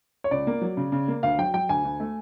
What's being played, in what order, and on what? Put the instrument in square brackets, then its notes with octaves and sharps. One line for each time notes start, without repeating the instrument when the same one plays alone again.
[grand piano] C#5
[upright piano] C#2 [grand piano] D5
[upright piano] A#3
F#3
C#3
C#3
A#3
[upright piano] D2 [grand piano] F5
[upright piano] F#3 [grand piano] G5
[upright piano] F#3 [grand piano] G5
[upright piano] D2 [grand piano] G#5
[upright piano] D2
A3